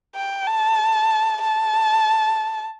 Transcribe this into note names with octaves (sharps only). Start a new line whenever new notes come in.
G5
A5
A5